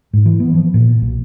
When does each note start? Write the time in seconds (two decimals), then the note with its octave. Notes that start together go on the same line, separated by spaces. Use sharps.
0.13 G#2
0.26 E3
0.40 B3
0.54 F3
0.74 A#2
1.02 B1